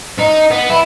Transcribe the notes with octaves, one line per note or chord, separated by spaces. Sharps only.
D#4
B3
E4